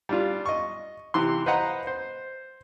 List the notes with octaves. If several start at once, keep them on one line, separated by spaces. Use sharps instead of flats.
G3 D4 F4
D#5 C#6
C3 E3 C6
B4 C5 D#5 F#5 A#5
C5